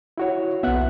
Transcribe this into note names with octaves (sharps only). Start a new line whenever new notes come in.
E4 F#4 C#5
B1 B3 E5 F#5 F#6